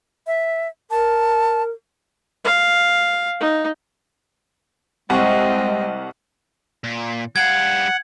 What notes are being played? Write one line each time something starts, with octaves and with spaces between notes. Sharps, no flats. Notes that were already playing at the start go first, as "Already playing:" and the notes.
E5
A#4 A5
F5
D#4
C2 G#3 C4 D#5 F#5 C#6
A#2
G3 F5 F#5 G#6